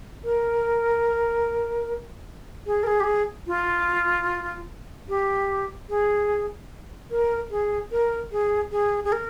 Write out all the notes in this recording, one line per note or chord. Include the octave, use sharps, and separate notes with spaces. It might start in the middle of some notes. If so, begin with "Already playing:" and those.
A#4
G#4
A#4
G#4
G4
G#4
F4
G4
G#4
A#4
G#4
A#4
G#4
G#4
G#4
A#4